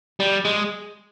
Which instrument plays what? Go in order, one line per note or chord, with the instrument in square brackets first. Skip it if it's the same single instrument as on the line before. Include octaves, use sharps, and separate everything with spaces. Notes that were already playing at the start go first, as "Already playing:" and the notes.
[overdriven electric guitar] G3
G#3